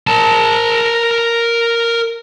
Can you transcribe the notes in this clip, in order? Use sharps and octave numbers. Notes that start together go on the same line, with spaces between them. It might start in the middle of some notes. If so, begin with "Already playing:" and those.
A#4 A5